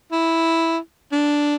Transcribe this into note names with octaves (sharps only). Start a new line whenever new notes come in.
E4
D4